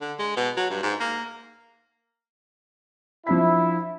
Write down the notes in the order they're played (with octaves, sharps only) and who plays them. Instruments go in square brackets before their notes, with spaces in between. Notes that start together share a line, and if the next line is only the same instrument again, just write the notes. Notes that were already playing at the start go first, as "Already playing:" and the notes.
[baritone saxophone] D3
G#3
B2
F#3
G2
G#2
A#3
[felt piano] F3 D4 B6 [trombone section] E4